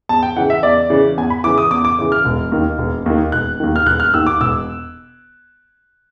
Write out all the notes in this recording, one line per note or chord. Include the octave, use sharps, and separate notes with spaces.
E2 A5
G5
C#3 E3 F#5
E5
E2 D5
C#3 E3
E2 G#5
B5
C#3 E3 D6
D#6
E2 D6
D6
C#3 E3
F6
E1
D#2 D#3
E1
D#2 D#3
E1 F#6
D#2 D#3
F6
E1 F#6
F6
D#2 D#3 E6
D6
E1 E6